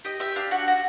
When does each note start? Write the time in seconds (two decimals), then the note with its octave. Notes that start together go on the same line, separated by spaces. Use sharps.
0.05 G4 D#5
0.20 G4 E5
0.36 D4 F5
0.51 F#4 F#5
0.68 F#4